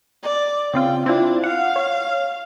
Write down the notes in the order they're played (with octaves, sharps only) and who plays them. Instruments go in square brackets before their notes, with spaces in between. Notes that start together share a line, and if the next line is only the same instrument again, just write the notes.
[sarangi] D5
[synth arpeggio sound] C#3 C4 F4 [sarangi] G5
[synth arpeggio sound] C4 E4 F4 [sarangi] D4
[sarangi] F5 [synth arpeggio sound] F#5
[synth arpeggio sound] C#5